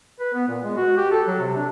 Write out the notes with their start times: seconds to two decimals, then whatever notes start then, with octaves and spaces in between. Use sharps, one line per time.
0.19 B4
0.34 B3
0.48 A#2
0.63 G#3
0.76 F#4
0.97 G4
1.11 A4
1.27 F#3
1.40 C3
1.56 D4